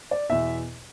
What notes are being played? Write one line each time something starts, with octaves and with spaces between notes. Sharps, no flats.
D5
E2 B2 E5